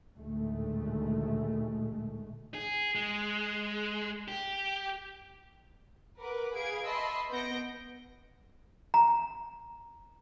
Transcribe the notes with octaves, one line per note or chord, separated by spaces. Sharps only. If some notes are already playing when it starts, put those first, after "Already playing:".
A1 D2 A#2 D#3 G#3 A3
G#4
G#3
G4
A#4 B4 F#5 D6
G#4 B4 F5 G#6 D7
D#5 E5 A5 B5 C6 E6
B3 G6 A#6 C#7 D7
A#5